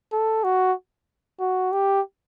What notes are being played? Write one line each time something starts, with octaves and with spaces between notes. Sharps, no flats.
A4
F#4
F#4
G4